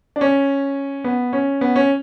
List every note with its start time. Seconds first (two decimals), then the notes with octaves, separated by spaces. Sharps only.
0.16 D4
0.21 C#4
1.04 B3
1.33 C#4
1.61 B3
1.76 C#4